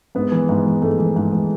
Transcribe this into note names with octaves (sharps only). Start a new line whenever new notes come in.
G#2 B3
E3
G#2
E3
G#2 A3
E3
G#2
E3